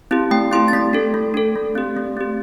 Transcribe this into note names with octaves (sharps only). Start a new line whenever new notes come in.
C4 E4 G4
A3 G5
C4 E4 G4 C6
A6
A3 B6
D4 A4
A3
D4 A4
A3
C4 G4
A3
C4 G4